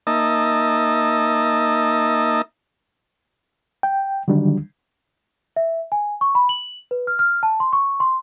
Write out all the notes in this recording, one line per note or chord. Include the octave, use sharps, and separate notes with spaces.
A#3 D#4 D#5 E5 A5 A#5
G5
D3 D#3 F#3 G3 D4
E5
G#5
C#6
B5
F#7
B4
F6
F6
A5
C6
C#6
C6